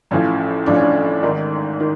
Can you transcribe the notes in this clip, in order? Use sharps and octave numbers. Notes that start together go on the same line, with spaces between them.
A1 A2 F3 C#4
A1 A2 F3 D4
C#4
D4
G#1 G#2 D#3 D#4
D#3